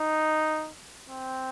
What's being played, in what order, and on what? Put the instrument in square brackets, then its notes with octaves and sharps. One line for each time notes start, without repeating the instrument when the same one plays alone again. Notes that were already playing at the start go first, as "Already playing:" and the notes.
Already playing: [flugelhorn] D#4
C4